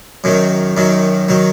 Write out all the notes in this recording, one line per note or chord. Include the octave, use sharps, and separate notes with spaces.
F#2 D#3 F#3
F#2 D#3 F#3
D#3 F#3